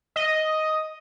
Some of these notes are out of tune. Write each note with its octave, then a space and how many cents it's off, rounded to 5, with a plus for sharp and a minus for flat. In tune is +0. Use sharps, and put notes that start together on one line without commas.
D#5 +5